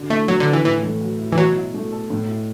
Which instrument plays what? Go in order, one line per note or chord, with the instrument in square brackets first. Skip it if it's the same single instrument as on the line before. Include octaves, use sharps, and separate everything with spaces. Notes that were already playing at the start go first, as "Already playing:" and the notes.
Already playing: [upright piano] D3 F#4
[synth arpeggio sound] A3 [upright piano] E4
[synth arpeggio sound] F#3 [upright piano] B3
[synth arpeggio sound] D3
[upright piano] B4
[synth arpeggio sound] E3
[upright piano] A2 [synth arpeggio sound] E3
[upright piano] A3
F#3
E4
[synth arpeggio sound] E3
[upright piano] B2 [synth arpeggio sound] F#3
[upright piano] E4
A3
A4
A2
E4